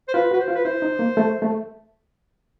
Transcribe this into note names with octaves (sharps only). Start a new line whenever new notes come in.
C5
F4 B4
F#4 B4
C5
F4
B4
E4 C5
D#4
A#3
A3
A3